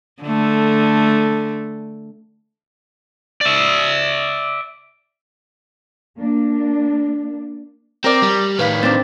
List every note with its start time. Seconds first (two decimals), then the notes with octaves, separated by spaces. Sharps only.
0.22 D3 A3
3.41 D5 E5
6.18 A#3 D4
8.04 C4 A#4 D5
8.22 G3
8.59 A2 D#3 B4 F5 B6
8.83 C4 D4 A6